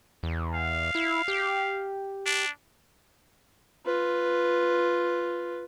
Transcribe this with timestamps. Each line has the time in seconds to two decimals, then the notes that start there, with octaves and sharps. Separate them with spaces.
0.23 E2
0.54 F5
0.95 E4
1.28 G4
2.26 D4
3.86 F4 B4